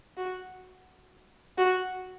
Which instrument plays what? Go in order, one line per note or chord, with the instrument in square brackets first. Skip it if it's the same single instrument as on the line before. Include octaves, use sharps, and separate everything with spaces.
[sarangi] F#4
F#4